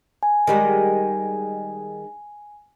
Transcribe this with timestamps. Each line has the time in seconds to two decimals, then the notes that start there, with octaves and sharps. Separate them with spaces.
0.23 G#5
0.47 D#3 G3 G#3